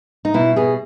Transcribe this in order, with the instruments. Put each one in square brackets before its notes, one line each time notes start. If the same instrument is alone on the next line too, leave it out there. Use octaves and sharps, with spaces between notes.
[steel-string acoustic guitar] D#4
B2 E4
B2 G#4